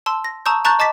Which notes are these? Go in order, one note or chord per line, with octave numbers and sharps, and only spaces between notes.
A5 C6 E6
A#6
A5 A#5 C#6 D#6 E6 G6
A5 A#5 C#6 F#6 G6 A6
D#5 A5 D6 A6 B6